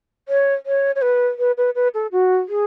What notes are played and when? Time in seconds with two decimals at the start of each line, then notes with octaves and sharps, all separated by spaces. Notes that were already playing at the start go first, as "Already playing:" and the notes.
0.28 C#5
0.66 C#5
0.95 C#5
1.02 B4
1.39 B4
1.57 B4
1.75 B4
1.94 A4
2.12 F#4
2.49 G#4